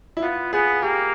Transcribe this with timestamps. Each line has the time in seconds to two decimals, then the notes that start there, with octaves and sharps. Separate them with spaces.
0.17 E4
0.22 B3 F4
0.53 B3 G#4
0.82 A#3 G4